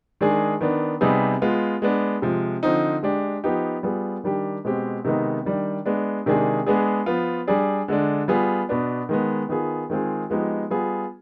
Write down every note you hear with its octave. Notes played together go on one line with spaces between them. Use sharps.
D#3 G#3 D4 G#4
D#3 B3 D4
C3 G3 B3 D#4 G#4
G#3 B3 F4
G#3 B3 D4
C3 F3 G#3
D3 F3 C4 D#4
G#3 D4 G4
F3 B3 D#4 G4
G3 B3 F4 G#4
D#3 G3 D4 G4
B2 G#3 C4 G4
C3 D#3 G#3 B3 D#4
D#3 G3 D4
G#3 B3 D4
C3 D#3 G#3 D4 G#4
G#3 B3 D4 G#4
F3 B3 F4
G3 D4 G#4
D3 G#3 D4
G3 B3 F4 G#4
B2 B3 D4
D#3 G#3 B3
D#3 B3 F4 G#4
D#3 G#3 C4 F4 G#4
F3 G#3 B3 D#4 G4
G3 B3 F4 G#4